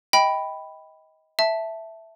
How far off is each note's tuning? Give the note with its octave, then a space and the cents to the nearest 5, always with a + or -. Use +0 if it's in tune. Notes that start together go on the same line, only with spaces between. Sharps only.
D#5 +25 G5 +0 B5 +0
E5 +0 A5 +0